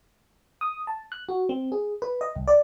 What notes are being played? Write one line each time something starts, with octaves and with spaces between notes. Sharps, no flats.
D#6
A5
F#6
F#4
C4
G#4
B4
D#5
C2
D5